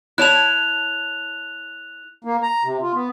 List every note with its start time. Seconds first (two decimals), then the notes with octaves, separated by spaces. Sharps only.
0.18 E4 C#5 A5 F#6 F7
2.24 A#3
2.43 A#5
2.65 C3
2.82 F4
2.94 B3